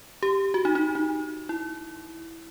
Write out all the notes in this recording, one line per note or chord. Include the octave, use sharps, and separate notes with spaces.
G4
F#4
D#4
D#4
D#4
E4